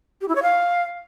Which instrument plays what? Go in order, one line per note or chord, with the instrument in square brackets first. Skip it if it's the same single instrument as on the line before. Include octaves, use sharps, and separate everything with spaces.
[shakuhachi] G4
E4
C#5
F5